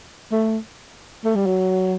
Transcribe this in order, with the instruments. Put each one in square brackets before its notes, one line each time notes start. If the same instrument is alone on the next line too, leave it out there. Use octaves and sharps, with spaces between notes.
[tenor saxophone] A3
A3
G3
F#3